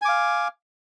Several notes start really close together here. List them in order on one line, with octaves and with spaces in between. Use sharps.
G#5 D6 F5